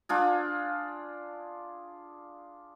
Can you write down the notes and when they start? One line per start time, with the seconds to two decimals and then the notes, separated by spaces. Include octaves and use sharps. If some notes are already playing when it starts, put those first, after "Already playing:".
0.09 D4 F4 G#4